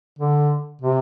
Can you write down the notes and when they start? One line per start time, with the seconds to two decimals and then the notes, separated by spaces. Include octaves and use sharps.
0.19 D3
0.82 C3